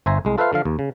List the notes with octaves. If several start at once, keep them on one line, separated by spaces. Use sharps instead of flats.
G1 C5 E5 G#5 A#5
C2 G#3
F4 A4 B4 C5 E5 F5
D3 F3 F5
D#2
C#3